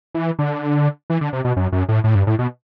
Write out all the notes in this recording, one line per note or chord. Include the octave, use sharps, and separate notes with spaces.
E3
D3
E3
D3
C3
B2
F#2
F#2
A2
A2
G2
A2
B2